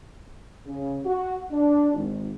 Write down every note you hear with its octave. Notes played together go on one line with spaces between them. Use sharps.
C#3
F#4
D4
G#1